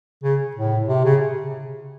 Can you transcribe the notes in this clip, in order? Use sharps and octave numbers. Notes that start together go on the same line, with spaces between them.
C#3
A2
C3
C#3